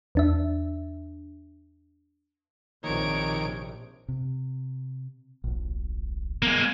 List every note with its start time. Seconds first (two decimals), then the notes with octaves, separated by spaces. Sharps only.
0.15 E2 D4 E5
2.84 A#1 C3 D#3 A#3 C#5 D7
4.08 C3
5.44 D1 A#1
6.42 G#3 A#3 B3